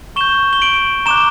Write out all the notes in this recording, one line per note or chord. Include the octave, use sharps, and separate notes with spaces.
C#6 G6 E7 G7
G7
D7 F#7
A#5 D6 F#6 E7 G7